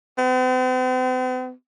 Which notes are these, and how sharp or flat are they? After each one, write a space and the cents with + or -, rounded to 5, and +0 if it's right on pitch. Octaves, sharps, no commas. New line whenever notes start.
C4 -45